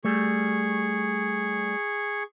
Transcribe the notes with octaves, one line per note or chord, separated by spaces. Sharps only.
G3 A3 G#4 C#6